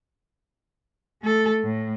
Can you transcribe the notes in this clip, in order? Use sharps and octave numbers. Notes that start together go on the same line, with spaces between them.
A3 A4
A2